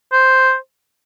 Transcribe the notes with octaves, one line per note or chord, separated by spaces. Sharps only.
C5